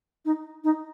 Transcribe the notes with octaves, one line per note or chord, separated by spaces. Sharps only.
D#4
D#4